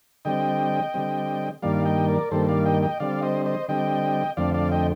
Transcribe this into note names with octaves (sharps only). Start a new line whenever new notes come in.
D3 G3 C4 D#5 G5
D3 G3 C4
G2 D#3 G3 A#3 D5 F5
D#5 G5
A#4 D5
G2 D#3 G3 A#3 A4 C5
D5 F5
D#5 G5
D#5 G5
D3 G3 C4 D5 F5
C5 D#5
C5 D#5
D3 G3 C4 D#5 G5
F2 D3 A3 C4 D5 F5
D5 F5
D#5 G5